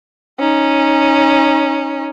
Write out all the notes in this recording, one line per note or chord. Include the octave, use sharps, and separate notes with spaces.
C#4 D#4